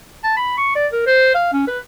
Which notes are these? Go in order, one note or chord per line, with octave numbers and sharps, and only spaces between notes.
A5
B5
C#6
D5
A#4
C5
F5
C#4
B4